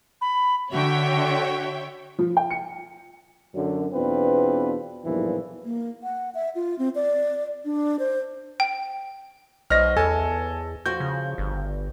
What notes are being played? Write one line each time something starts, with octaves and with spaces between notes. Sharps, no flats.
B5
D3 F#4 C#5 E5 G5
F3
G5
C#7
F#2 D3
E2 B2 C4 D4 F4 B4
B1 E2 G2 A#2 E3 F3
A#3
F#5
E5
F4
C4
D5
D4
C5
G5
B1 C5 C#5 D#5 F6 A#6
E2 A4 C#5 G#5 A5
F3 F#4 G6
C#3
G1